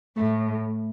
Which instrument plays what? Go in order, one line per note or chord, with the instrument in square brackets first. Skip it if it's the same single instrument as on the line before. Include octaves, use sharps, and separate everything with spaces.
[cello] A2 [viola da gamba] A3